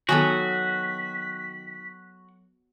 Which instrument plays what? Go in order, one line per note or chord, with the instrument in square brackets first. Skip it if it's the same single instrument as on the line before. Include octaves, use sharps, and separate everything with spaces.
[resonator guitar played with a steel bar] D#3 G#5 [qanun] F#3 B3 A4 [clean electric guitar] F#4 [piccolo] B6